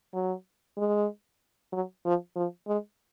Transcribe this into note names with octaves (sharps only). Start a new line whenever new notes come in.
F#3
G#3
F#3
F3
F3
G#3